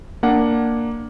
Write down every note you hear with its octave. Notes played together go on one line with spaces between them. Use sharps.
A#3 D4 F#5